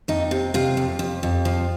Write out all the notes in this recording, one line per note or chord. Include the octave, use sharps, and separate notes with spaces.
F2 D#4
C3
C3 F4
F2
F2
F2
F3